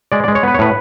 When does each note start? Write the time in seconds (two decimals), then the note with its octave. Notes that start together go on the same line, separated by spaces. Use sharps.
0.12 G#3 D5
0.24 D5
0.28 G#3
0.35 C#5
0.43 B3 B4
0.54 C#5
0.59 A2 B4